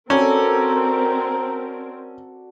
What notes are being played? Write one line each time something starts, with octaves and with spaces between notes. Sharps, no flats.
C4 C#4 F#4 A4 A#4 D5 A#5